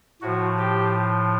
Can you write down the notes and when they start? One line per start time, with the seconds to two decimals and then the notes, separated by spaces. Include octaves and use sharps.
0.22 A2 F3 F#4
0.58 G4